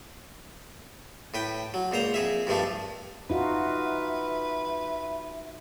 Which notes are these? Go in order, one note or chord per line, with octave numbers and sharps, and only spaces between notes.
A2 B4 G5
F#3
C#2 A#2 C5 A#5
F2 G#4 E5
G2 D#3 F3 A3 D4
D#4 F4 F#4 B4 E5